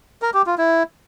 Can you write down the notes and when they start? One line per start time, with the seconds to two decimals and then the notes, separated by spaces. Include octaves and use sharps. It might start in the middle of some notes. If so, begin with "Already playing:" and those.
0.22 A#4
0.34 G4
0.47 F4
0.58 E4